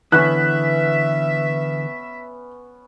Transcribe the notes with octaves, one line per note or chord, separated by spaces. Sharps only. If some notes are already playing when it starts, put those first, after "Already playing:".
D3 E3 B3 C#4 E5 F#6